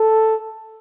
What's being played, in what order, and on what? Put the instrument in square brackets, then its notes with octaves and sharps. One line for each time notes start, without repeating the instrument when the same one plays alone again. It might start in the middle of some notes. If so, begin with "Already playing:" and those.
Already playing: [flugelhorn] A4